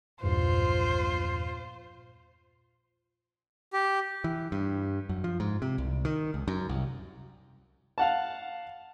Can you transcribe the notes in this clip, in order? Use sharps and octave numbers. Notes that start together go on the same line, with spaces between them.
A#1 E2 G2 F4 C5
G4
E3
G2
F#2
F3
G#2
C3
C2
D#3
C#2
F#2
C2
F5 F#5 A5